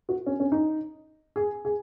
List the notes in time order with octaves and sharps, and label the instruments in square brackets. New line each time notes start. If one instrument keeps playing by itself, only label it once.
[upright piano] F#4
C#4
C#4
D#4
G#4
G#4